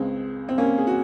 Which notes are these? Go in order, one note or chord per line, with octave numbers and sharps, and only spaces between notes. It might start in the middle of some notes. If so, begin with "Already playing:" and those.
Already playing: C#2 C#3 G#3 C4
C4
A#3 C#4
G#4
F#4